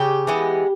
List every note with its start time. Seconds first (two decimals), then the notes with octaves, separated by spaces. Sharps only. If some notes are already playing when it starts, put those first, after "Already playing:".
Already playing: C#3 G4
0.27 E3 G#3 B3